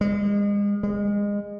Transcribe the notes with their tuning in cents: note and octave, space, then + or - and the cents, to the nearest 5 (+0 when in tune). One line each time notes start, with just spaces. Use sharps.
G#3 -35
G#3 -25